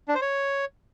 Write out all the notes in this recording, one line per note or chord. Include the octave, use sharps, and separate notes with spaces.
D4
C5
C#5